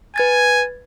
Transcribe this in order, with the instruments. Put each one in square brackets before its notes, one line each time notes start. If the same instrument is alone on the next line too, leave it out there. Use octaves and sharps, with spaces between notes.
[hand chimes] B4 G#6 A6 [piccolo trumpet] G#5